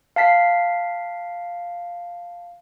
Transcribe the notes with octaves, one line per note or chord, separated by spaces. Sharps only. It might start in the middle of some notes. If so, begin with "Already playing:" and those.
F5 A5 B6 C7